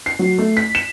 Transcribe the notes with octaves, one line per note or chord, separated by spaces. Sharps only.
C7
F#3
A3
B6
E7